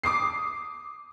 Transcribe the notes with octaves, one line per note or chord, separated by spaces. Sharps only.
D6 D#6 C7